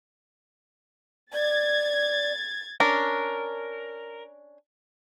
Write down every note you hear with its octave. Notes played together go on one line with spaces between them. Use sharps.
D5 G#6 A6
C#4 D4 A#4